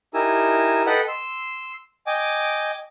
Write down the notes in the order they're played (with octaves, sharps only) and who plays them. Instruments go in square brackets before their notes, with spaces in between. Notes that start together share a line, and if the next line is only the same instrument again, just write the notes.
[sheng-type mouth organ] D#4 E4 G4 A#4 G#5 E6
A4 B4 D#5 F#5 G5
C6 E6
D#5 G5 G#5 D6